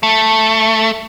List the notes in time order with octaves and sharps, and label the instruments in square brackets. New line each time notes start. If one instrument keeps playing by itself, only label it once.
[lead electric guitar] A3